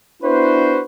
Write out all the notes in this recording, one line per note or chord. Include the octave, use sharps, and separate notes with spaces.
B3 D4 E4 F#4 B4 C5